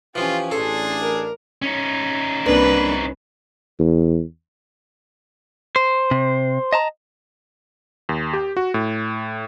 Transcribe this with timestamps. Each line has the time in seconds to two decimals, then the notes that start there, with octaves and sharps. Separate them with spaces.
0.15 E3 F3 C#4 F4 G4
0.51 A1 D4 G#4 A4 C6
1.02 A#4
1.62 C#4 D#4
2.46 C2 A#3 D4 B4
3.79 E2
5.76 C5
6.11 C3
6.73 D#5 A5 A#5
8.09 D#2
8.33 G4
8.57 F#4
8.74 A2